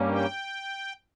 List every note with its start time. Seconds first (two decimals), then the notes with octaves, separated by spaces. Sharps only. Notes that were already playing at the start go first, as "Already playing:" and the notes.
Already playing: G2 G3 A#3 C#4
0.10 G5